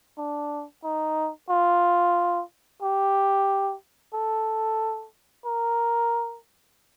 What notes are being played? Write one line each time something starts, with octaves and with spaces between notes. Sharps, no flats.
D4
D#4
F4
G4
A4
A#4